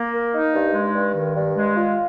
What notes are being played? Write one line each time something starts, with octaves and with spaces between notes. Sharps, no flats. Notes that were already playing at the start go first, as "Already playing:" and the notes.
Already playing: A#3
A#4
D#4
G2
G#3
G2
D#3
G2
G#3
F4